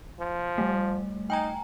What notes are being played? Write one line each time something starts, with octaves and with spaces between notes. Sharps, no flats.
F3
G3 A3
D#4 G5 G#5 A#5